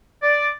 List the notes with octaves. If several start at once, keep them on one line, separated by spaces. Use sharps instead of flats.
D5